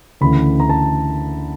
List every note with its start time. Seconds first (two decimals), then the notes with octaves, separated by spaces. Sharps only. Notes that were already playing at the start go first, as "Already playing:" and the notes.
0.21 D2 C#3 E3 A3 B5
0.60 A#5
0.69 A5